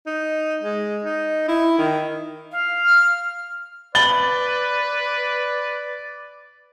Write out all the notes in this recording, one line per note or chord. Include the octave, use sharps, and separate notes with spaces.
D#4
G#3
D#4
E4
D#3
F5
F6
B4 D5 B5 A6 F#7 G7